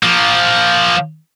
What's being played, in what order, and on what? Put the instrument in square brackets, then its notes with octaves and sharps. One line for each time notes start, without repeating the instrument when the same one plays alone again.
[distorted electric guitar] F3 A#3